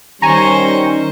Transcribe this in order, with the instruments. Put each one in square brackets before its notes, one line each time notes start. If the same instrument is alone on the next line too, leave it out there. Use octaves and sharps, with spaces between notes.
[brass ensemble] D#3 G3 C#4 [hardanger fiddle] C5 C#6 [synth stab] G#5 A#5